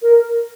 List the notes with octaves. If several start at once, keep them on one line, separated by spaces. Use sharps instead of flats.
A#4